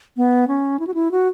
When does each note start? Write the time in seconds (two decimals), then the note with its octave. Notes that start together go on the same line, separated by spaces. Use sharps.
0.17 B3
0.48 C#4
0.80 E4
0.87 F#4
0.94 E4
1.11 F#4